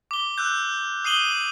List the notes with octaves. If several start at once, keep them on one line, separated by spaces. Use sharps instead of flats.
D6 G7
E6 F#6 G6
D#6 C7 D#7 F#7 G7